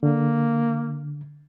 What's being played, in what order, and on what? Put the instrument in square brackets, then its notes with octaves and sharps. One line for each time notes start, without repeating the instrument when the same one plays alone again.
[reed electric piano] D3 [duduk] A#3